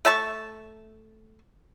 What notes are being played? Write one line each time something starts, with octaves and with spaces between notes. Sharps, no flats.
A3 E5 A5 C#6